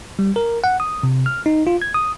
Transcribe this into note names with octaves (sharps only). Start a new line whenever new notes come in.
G3
A#4
F#5
D#6
C3
F6
D#4
F4
G#6
D#6